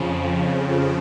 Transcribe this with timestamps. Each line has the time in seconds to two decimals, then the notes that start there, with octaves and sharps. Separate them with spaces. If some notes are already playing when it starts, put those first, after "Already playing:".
Already playing: F2 C#3 F3